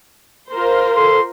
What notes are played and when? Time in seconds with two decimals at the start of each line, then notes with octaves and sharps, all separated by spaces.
0.50 F4 A#4 C5
0.96 A4 C6